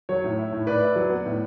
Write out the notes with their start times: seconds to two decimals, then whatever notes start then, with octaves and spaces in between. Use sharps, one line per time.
0.09 F#3 C#5
0.24 A2
0.38 E4
0.53 A2
0.67 A2 B4 D5
0.81 E4
0.96 F#3
1.10 B3
1.25 A2